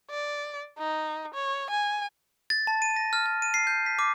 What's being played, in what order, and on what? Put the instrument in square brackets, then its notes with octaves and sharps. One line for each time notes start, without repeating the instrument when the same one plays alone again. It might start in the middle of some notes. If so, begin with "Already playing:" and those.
[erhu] D5
D#4
C#5
G#5
[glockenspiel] A6
A5
D#7
A#6
F6
F6
D#7
C7
G6
B6
D6